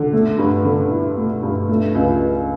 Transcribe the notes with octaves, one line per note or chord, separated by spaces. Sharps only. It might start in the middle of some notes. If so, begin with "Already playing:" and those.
Already playing: D3
A3
G2
D3
E4
A3
G2
A3
C#2